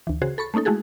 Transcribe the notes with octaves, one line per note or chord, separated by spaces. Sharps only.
D2 E3
C#3 F#4 G#4 C5
A4 B5 C#6 A6
A3 A#3 C#4 D#4 A4
G#3 A3 E4 F#4 G#4 A4